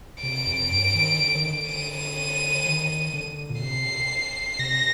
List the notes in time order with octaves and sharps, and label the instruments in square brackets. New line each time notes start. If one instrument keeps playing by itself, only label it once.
[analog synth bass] C3 [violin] D7
[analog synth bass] F2
G2
D#3
D3
D#3
D3
[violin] D#7
[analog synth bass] D#3
D3
A#2
[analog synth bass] C3 [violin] C7
[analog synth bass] C3 [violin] A#6